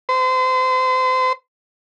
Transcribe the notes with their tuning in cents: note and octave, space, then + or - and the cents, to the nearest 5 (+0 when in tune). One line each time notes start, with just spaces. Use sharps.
C5 -35